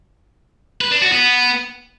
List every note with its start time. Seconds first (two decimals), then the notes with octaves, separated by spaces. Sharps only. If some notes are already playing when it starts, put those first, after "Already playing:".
0.81 B4
0.92 D4
1.02 F#4
1.12 B3